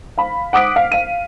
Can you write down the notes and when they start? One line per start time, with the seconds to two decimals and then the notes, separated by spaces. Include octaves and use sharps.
0.18 F5 B5
0.53 F#5 D6 D#6 B6 D7
0.76 F5
0.92 F5 D#7